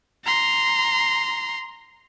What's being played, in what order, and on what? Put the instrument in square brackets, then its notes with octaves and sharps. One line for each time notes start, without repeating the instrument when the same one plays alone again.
[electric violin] A#5 C6